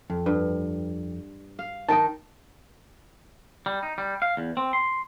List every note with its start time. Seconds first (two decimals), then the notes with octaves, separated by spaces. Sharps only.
0.10 F2
0.26 G2
1.59 F5
1.89 D#3 D#4 G5 A5
3.66 G3
3.83 D#4
3.98 G3
4.22 F5
4.37 E2
4.57 C4
4.73 C6